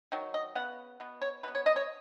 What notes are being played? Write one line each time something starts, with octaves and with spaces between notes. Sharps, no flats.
D#3 F#3
D#5
C#3 B3 F#5
B2 B3
C#5
B2 B3 B4
C#5
D#5
C#5